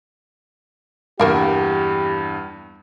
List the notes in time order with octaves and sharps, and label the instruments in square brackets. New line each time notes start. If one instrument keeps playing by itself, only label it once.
[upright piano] E2 G2 [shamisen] A#3 A#4 F5 [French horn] G4